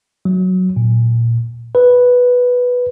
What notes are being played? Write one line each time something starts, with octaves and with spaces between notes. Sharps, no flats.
F#3
A#2
B4